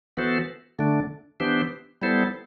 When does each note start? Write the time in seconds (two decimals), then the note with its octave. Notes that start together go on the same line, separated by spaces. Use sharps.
0.17 E3 B3 F#4 A4 C5
0.79 D3 A3 D4
1.40 E3 B3 D4 G4 C5
2.02 G3 B3 E4 A4 C5